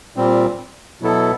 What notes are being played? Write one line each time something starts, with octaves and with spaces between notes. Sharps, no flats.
A#2 G3 C4
B2 F#3 B3 E4 A4